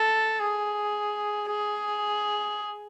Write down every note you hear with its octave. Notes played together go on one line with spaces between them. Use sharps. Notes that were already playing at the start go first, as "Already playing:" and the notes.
Already playing: A4
G#4
G#4